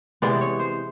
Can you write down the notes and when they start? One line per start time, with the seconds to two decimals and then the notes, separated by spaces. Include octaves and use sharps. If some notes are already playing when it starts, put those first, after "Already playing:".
0.22 C3 E3 G#3 B3 D5
0.41 C#5
0.59 C5